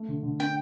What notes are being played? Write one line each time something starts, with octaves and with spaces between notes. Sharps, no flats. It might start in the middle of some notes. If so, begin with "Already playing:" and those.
Already playing: A3
D3
D3
D4 G5